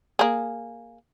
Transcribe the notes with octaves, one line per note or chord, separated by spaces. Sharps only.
A#3 G#4